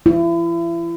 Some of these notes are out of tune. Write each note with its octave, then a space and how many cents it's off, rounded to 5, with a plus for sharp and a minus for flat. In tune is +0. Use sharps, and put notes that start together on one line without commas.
E4 +35